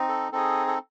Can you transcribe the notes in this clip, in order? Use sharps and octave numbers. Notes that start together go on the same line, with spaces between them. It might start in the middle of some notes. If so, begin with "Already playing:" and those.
Already playing: C4 D#4
A4
C4 D#4 G#4 A4
A4